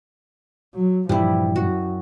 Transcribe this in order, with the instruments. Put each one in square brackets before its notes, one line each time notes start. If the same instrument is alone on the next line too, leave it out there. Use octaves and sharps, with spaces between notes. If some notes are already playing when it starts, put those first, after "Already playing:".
[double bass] F#3
[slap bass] G2 A#2 E3 [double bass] F3 [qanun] G3 E4
[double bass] F#2 [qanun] F#4